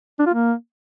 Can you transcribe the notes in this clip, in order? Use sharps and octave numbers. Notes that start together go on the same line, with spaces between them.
D4
F4
A#3